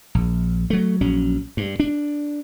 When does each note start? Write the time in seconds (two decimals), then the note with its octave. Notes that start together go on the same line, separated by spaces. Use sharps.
0.15 A#1
0.70 F#3 A3
1.01 A#1 F#3 C#4
1.57 G2
1.80 D4